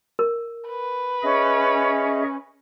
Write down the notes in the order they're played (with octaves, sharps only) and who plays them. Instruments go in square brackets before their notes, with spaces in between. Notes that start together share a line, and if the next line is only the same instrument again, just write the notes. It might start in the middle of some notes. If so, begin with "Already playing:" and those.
[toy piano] A#4
[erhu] B4
[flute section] C#4 [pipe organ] G#4 D#5 E5